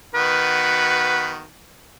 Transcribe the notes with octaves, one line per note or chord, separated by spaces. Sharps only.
D#3 B3 F#4 B4